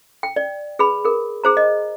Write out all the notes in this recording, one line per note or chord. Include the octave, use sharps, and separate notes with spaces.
G5
D5
G#4 B4 B5
G#4 A#4
G#4 C5 A#5
D#5